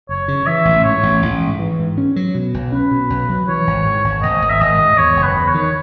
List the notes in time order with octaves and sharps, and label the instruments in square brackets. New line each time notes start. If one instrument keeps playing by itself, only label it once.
[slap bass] F#1 [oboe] C#5
[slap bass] C#3
[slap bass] E3 [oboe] E5
[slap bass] A1
[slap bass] G#2 [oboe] C#5
[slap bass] A1
A1
G#2
E3
G#2
C#4
F#3
B2
B1
[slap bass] C#4 [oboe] B4
[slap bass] B2
B1
F#3
[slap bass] E3 [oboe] C#5
[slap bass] G#1
G#2
G#1
[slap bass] G#1 [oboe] D#5
[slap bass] G#1
[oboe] E5
[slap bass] G#1 [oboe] D#5
[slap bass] G#2
[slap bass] E2 [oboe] C#5
[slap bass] F#1
[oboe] B4
[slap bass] E2
[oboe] C#5
[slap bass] D#3